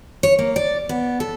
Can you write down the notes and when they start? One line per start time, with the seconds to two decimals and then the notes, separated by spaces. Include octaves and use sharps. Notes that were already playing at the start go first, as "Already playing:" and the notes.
0.23 C#5
0.39 A#3
0.56 D5
0.89 B3
1.20 A4